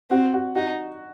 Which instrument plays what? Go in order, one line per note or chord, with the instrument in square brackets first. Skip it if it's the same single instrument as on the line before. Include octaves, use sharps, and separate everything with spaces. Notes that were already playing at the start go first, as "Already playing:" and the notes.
[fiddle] C4 [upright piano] F#4
[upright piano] F#4
[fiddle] D#4 [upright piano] F#4